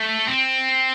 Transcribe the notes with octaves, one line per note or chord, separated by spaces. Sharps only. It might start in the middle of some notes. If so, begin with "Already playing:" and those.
Already playing: A3
C4